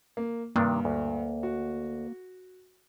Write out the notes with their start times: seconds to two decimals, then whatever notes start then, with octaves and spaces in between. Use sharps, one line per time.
0.17 A#3
0.56 G2 C3 D#3 A#3 D4
0.85 D2
1.43 F#4